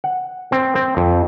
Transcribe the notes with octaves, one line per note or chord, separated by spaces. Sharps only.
F#5
C4
C4
F2